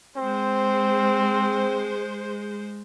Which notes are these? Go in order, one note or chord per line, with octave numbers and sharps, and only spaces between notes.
G#3 C4 C5